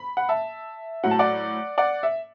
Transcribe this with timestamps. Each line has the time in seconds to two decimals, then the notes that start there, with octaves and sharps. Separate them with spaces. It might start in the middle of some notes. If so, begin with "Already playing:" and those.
Already playing: B5
0.17 F#5
0.29 E5 A5
1.03 A2 F#3 F#5
1.11 A5
1.19 D5 F#5
1.78 D5 F#5
2.03 E5